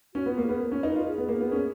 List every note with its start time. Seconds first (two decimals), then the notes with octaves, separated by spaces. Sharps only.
0.14 C#4 F#4
0.26 B3 F4
0.38 A#3
0.45 B3 G#4
0.60 A#4
0.72 C#4
0.83 D#4 B4
0.95 F4
1.07 G#4
1.18 B3
1.28 A#3
1.41 B3
1.52 C#4